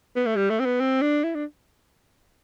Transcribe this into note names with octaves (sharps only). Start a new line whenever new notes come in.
B3
A3
G3
A3
C4
B3
C4
D4
E4
D4